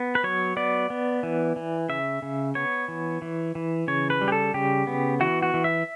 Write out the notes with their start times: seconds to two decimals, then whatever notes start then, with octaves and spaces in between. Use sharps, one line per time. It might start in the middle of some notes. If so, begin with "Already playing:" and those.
Already playing: B3
0.15 B4
0.24 F#3 C#5
0.57 B3 D5
0.90 B3
1.23 E3
1.56 E3
1.89 C#3 E5
2.22 C#3
2.55 B3 C#5
2.88 E3
3.22 E3
3.55 E3
3.88 C#3 C#5
4.10 B4
4.21 G3
4.28 G4
4.32 A4
4.54 C#3 G4
4.87 B3
5.20 E3 F#4
5.43 F#4
5.54 E3
5.64 E5